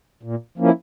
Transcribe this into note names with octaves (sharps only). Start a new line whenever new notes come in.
A#2
F3 A#3 C#4 E4